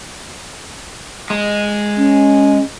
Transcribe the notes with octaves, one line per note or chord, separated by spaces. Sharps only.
G#3
C#4